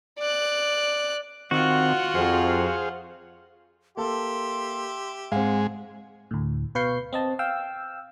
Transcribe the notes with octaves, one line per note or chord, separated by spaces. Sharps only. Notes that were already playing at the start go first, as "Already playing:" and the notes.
D5 F#6
D#3 C4 F4 F#4 F#5
F2 G#4 C5 F5
A#3 G4 A4 E5 C6
G#2 G#3 C4 F5 F#5
D2 A2
B2 B4 F5 C#6 G6 C7
C4 D#5 A5
F5 G5 E6